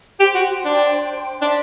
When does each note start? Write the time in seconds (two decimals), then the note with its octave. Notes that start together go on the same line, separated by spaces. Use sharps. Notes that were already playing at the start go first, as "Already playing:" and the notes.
0.20 G4 C5 G5 C6
0.35 F#4
0.65 D4
1.41 D4 C5 E5 A5 C6